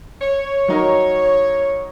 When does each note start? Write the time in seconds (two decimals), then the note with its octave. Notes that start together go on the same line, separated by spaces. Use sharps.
0.22 C#5
0.68 F#3 D#4 A#4